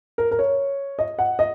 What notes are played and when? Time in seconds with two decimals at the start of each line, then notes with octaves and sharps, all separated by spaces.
0.18 A#4
0.31 A#4
0.39 C#5
0.99 D#5
1.19 F#5
1.39 D#5